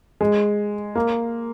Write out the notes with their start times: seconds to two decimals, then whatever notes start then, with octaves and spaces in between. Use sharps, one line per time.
0.21 G#3
0.95 A#3